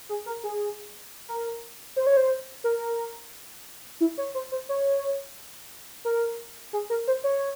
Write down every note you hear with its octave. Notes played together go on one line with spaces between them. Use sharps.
G#4
A#4
G#4
A#4
C5
C#5
C5
A#4
E4
C#5
C5
C5
C#5
A#4
G#4
A#4
C5
C#5